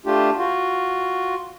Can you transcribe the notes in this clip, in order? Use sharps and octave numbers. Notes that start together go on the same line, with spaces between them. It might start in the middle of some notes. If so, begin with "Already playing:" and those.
A3 D4 F4 G4
F4 F#4